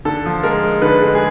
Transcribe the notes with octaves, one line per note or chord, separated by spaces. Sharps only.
D3 A4
F3
G#3 A#4
G#3
D3 B4
G#3
G#4